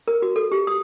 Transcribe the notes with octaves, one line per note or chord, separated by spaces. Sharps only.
A#4
F#4
A4
G4
D#6